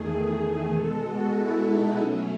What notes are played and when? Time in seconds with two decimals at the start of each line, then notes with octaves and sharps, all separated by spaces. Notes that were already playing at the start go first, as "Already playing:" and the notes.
Already playing: E2 D#3 A3 G#4
0.72 B2 G#3 A4
1.03 F#4
1.34 E4
1.65 D#4
1.96 B2 F#3 A3 C#4